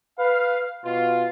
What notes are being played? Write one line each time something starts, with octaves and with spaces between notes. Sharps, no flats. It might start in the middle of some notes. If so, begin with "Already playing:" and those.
B4 F5
B2 F4